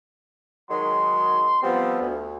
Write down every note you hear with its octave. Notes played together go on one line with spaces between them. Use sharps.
D#3 F#3 G#3 C6
F3 G3 B3 C4
D2